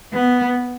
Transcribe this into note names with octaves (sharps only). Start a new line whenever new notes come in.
B3